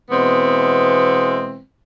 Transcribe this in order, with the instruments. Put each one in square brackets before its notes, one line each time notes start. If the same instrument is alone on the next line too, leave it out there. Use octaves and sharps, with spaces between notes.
[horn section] B2 E3 G#3 B3 C4